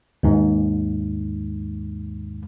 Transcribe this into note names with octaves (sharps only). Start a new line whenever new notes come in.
D#2 G#2